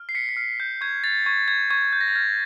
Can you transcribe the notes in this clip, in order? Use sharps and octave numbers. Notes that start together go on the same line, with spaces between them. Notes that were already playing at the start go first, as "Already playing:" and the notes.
Already playing: F6
C7
B6 C#7
B6
F6 C7
G6
C#6 G#6
A6
C#6 G#6
G#6
C#6 G#6
G6
A#6
A6
F6 G#6